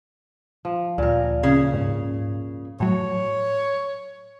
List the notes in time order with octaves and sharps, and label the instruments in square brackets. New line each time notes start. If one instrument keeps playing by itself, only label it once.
[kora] F3
[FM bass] D2 [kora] A#2 A#4
[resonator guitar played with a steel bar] C#3
[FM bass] G#2
[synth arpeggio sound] A2 F#3 [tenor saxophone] C#5